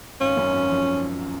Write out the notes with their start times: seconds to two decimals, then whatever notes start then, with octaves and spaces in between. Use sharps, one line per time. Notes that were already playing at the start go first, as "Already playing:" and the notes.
0.21 G#1 C#4
0.37 F#2
0.53 G#1
0.69 F3